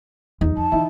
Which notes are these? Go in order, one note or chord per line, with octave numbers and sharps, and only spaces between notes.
E2 D#4
F2 A5
D3 E3 D#4 E4